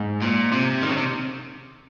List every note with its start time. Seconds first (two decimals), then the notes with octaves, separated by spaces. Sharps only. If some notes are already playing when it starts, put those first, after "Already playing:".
Already playing: G#2
0.22 A#2
0.52 C3
0.82 D#3
0.89 C#3
0.97 C3